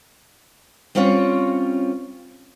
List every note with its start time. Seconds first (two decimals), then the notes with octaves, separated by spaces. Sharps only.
0.95 G3 C4 C#4 F4 C#5